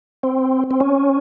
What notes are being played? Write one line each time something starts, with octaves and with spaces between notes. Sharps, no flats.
C4
C4
C#4